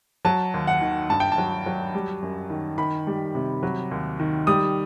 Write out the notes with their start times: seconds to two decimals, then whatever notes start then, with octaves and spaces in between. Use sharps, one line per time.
0.25 F#3 A5
0.54 D#2
0.67 F#5
0.81 D#3
1.09 G2 A5
1.20 G5
1.32 A5
1.38 F#3
1.66 F#3
1.95 G3
2.22 F#2
2.50 D#3
2.78 D#3 B5
3.07 G3
3.35 C3
3.63 F#3
3.91 D#2
4.20 D#3
4.47 G3 D#6